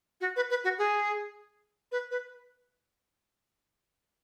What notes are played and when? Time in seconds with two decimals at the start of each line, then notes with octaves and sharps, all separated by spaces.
0.20 F#4
0.36 B4
0.50 B4
0.64 F#4
0.78 G#4
1.91 B4
2.10 B4